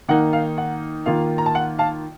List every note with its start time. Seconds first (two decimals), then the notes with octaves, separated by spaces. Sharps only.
0.09 D#3 A#3 D#4 F#5
0.33 F5
0.58 F#5
1.06 D#3 A#3 F4 F5
1.38 A#5
1.46 A5
1.55 F#5
1.79 F5 A5